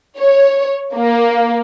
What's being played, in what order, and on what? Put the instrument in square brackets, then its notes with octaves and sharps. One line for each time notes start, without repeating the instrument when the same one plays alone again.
[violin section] C#5
A#3